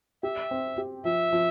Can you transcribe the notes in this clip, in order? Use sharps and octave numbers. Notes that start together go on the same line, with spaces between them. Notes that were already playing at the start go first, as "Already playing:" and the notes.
G4 E5
C4
G4
F3 E5
F3